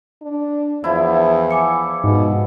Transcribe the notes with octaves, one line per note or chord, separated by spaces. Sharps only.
D4
E2 F3 E4 E5
G#5 D6 C#7
G#2 B2